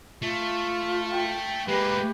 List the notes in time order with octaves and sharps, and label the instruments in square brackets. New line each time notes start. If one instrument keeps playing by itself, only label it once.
[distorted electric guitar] A3 [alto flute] F4
[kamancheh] G5
[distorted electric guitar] G#3 A#3 [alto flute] G4 [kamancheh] B4